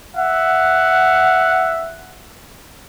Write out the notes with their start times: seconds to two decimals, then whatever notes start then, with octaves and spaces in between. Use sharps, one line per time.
0.17 E5 F#5